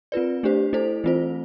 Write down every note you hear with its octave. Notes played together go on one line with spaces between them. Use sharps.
C4 F4 B4 D5
A3 D4 G4 C5
A3 E4 A4 C5
E3 A3 C4 F4 C5